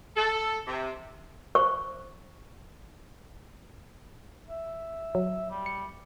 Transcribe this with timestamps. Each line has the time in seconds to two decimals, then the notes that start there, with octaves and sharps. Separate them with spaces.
0.17 A4
0.67 C3
1.55 C5 C#6
4.50 E5
5.15 F#3
5.50 G3
5.66 C#7